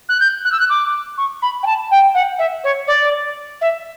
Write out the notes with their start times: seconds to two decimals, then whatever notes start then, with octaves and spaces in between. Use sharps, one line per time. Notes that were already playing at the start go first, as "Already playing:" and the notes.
0.09 F#6
0.20 G6
0.45 F#6
0.52 E6
0.60 F#6
0.69 D6
1.17 C#6
1.42 B5
1.63 G5
1.66 A5
1.91 G5
2.14 F#5
2.39 E5
2.64 C#5
2.87 D5
3.61 E5